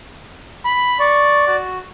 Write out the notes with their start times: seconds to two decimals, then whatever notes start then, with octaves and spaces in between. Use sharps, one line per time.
0.65 B5
1.00 D5 C#6
1.47 F#4